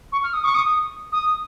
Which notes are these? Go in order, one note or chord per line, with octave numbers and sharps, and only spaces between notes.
C#6
F6
D#6
C#6
D#6
D#6